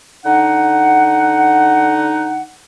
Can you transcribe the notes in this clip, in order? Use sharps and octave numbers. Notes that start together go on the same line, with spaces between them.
D3 D#4 F#5